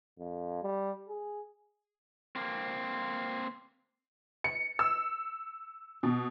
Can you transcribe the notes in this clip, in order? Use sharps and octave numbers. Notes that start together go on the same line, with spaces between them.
F2
G3
G#4
A#3 C4
C#7
E6
B2